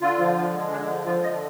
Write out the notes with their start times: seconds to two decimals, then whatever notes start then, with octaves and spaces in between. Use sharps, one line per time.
0.01 D3 F4
0.19 F3
0.36 D3
0.53 G#3
0.71 D3 D4
0.88 F3
1.06 F3 F4
1.22 D3 D#5